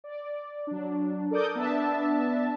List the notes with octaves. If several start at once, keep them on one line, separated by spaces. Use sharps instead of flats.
D5
F#3 D4
A4 A#4 D5 D6 D#6 G6
B3 D4 E5 A5